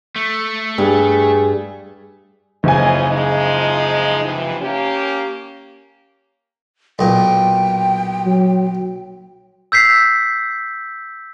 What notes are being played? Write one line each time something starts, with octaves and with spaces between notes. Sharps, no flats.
A3
G2 G#4
F#1 D#2 F3 D#5 G#5
F3 G#3 D#4
C3 E3 F3
A#3 C#4 G4
B1 A#2 G5
F#3
E6 G6 B6 C7